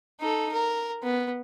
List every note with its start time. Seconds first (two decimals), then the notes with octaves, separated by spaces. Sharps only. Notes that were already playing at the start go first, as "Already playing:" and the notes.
0.20 D#4 A4
0.53 A#4
1.02 B3